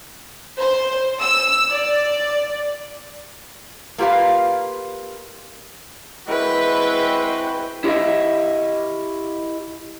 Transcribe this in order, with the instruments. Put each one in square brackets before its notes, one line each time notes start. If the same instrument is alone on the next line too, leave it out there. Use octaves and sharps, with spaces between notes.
[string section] C5
E6
D5
[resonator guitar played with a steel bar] A#3 F4 G4 B4 F5
[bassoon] G#3 [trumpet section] C4 F#4 G5 [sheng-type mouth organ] E4 [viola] B4
[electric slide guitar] E4 G4 B4 D#5 E5